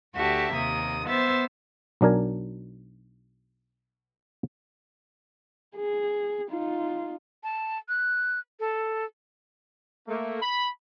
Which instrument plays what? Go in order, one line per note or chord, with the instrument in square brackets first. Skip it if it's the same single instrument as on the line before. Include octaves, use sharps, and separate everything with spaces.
[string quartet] D2 F#4 G4 E5 A5
D#2 C3 A#3 D#6
B3 C5 E5 E6 A6
[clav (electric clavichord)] B1 F#3 D4 A#4 G#5
[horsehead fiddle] G#4
D#4 F4
[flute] A5
F#6
A4
[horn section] A3 A#3
B5